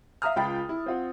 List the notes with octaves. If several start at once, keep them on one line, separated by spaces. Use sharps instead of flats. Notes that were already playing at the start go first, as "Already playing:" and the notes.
E5 F5 A#5 D#6 F6
C#2 F4 F5 G5 B5 A6
E4
C4 F4 F#5